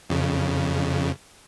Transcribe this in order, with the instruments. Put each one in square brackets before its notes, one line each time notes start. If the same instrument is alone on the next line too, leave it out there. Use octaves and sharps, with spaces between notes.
[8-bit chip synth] F2 C#3